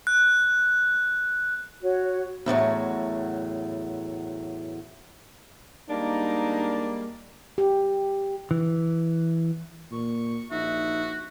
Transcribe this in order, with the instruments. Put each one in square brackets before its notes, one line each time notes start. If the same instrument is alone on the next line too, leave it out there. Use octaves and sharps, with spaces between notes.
[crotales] F#6
[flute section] F#4 C#5
[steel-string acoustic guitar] E2 A2 F3 F#3
[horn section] G3 G#3 A#3 [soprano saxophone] D4 [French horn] D#4
[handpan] G4
[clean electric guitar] E3
[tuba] A#2 [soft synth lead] C#6
[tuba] A#1 [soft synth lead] D#4 [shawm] F#4 [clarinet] E5